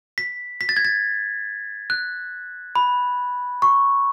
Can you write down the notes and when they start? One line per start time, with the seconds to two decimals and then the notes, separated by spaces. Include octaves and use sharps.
0.18 B6
0.61 B6
0.69 A6
0.77 G#6
0.85 A6
1.90 F#6
2.76 B5
3.62 C#6